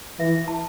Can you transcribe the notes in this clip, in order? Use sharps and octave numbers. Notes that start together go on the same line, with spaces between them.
E3 E5
A5